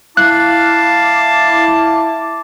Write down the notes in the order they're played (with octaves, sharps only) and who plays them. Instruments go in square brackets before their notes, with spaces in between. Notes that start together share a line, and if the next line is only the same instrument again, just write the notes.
[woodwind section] E4 D6 [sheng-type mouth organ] F5 [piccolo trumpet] A5 [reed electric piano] F#6